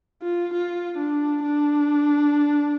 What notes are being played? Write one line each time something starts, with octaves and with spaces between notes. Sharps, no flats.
F4
F4
D4
D4